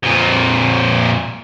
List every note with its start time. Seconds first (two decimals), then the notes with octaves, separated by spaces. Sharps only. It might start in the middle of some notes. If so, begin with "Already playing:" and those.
0.03 F2 A#2